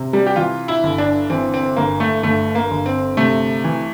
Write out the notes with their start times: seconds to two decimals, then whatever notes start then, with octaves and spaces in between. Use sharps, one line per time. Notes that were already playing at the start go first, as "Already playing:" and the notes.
Already playing: C3
0.13 G3
0.27 G4
0.36 E3 F4
0.68 E4
0.83 G1
0.98 D4
1.30 E3 C4
1.54 C4
1.77 G1 A#3
2.00 A3
2.23 G1 A3
2.55 A#3
2.71 G1
2.86 C4
3.17 C3 A3
3.64 E3